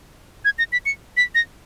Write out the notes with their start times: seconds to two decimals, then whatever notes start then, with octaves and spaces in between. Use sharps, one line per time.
0.45 G#6
0.58 A#6
0.72 B6
0.86 C#7
1.17 B6
1.35 A#6